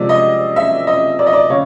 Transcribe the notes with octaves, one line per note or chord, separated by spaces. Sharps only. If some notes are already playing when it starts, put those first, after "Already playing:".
Already playing: C3 F3 G#3 D5
D#5
E5
D#5
D5
D#5
D5
C#3 C#5